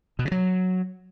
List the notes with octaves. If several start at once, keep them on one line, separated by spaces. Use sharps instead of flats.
B2
C#3
F#3